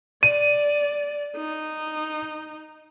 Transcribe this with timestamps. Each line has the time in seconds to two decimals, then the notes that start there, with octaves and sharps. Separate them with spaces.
0.23 D5 D#7
1.36 D#4